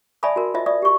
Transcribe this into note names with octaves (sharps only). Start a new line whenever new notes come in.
D5 E5 G#5 A5 B5 D#6
F#4 A#4
F4 C5 D#5 E5
D5 E5 D#6
G4 C#6